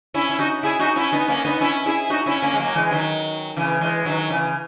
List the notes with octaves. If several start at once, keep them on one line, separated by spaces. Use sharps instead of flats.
C#4 E4
E4
D#4 F#4
E4 G#4
D#4 F#4
C#4 E4
B3 D#4
A#3 C#4
B3 D#4
C#4 E4
E4 G#4
D#4 F#4
C#4 E4
A#3 C#4
G#3
F#3 A#3
E3 G#3
D#3 F#3
C#3 E3
E3 G#3
D#3 F#3
C#3 E3